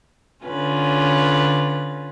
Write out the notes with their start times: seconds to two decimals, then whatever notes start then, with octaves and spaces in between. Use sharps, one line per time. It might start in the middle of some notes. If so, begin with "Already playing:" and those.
0.45 D3 C#4 F4 B4